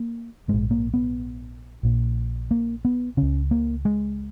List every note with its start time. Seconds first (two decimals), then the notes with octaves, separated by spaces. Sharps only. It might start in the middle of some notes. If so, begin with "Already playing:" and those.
Already playing: A#3
0.48 A#1 G#2 G#3
0.71 A#3
0.94 B3
1.83 A#1 A#2
2.51 A#3
2.85 B3
3.17 C#2 C#3 C#4
3.51 A#3
3.85 G#3